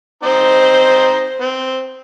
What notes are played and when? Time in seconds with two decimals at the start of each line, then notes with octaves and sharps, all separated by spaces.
0.24 C4 D#4 C5 D#5
1.40 C4